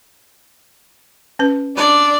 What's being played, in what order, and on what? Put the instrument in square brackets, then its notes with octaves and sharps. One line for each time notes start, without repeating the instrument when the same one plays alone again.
[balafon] C#4 B4
[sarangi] D4 [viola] D5